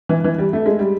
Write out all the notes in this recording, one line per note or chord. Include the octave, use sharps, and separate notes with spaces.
E3
E3
G3
A3
G#3
G3